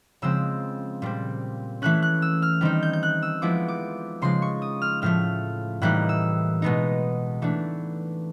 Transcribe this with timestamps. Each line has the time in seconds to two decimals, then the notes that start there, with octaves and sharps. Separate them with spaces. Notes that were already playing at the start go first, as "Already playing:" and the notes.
0.22 C#3 F3 G#3 C4 E6
1.02 A#2 G3 C4
1.82 E3 A3 C#4 F#6
2.02 F#6
2.22 E6
2.42 F6
2.61 D#3 G3 C4 D#4
2.83 G6
2.93 G6
3.03 F#6
3.23 E6
3.42 F3 G#3 B3 E4 D6
3.68 D6
4.22 C#3 F3 G#3 C6
4.42 C#6
4.62 D#6
4.82 F6
5.02 A2 F3 A3 F6
5.82 A2 E3 G3 A#3 D#4 F#6
6.09 E6
6.62 B2 G#3 B3 D#4
7.42 E3 A3 D4